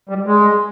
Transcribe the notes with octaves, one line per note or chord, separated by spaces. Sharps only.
G3
G#3